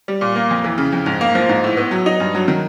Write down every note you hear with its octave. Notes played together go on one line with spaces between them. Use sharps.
G3
A#2
A#3
F2
E3
C#3
F2
G#2
A#3
F3
G#2
A2
B3
F#3
D#4
G2
F#3
D#3